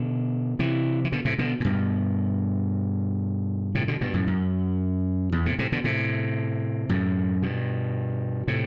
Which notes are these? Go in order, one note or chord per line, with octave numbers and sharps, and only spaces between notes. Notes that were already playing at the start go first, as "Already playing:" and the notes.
Already playing: B2 D3
C3 E3
E3
B2 D3
A2 C3
B2 D3
A2
G2 B2
A2 C3
B2 D3
G2 B2
F#2 A2
F#2
E2
A2 C3
A2 C3
B2 D3
A2 C3
F#2 A2
G2 B2
A2 C3